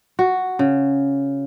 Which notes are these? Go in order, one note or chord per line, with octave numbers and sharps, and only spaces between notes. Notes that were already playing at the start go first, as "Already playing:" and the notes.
F#4
C#3